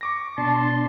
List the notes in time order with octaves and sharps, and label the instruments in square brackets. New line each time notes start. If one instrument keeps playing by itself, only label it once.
[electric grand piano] C#6 D6 A#6
[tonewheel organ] B2 D4 C6 [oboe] A5